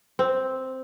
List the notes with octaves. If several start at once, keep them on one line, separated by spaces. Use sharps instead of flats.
C4